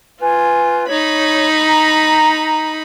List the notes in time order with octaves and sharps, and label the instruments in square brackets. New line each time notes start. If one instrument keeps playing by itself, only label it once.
[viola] F4 [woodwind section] B4 G#5
[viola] D#4 B5 [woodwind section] C#5
[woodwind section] A#5